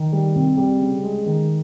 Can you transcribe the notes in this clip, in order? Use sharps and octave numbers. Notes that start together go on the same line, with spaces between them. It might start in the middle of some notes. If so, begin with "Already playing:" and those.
Already playing: D#3
G3
C3
G3
C#3
G#3
D#3